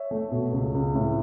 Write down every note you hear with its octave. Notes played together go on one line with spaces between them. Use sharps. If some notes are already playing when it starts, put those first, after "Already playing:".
Already playing: C#5 E5
A3
B2
C#2
C#2
A2